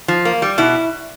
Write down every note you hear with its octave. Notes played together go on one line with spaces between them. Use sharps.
F3
A#3
G3
B2 E4